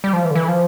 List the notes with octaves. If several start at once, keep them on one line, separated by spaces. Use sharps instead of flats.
G3
F3
E3
D3
E3
F3